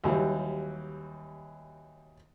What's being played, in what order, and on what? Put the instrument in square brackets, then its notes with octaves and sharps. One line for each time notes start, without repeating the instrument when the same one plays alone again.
[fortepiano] D#2 E3 F#3 G3